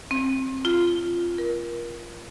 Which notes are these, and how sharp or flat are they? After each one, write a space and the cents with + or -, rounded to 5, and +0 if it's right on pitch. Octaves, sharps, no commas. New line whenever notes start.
C4 +20
F4 -15
A#4 +25